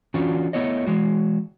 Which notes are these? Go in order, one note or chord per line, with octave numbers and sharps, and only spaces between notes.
E3 C#4 D4 F4 F#4
A3 B3 E4 C#5 D#5
E3 G#3 F#4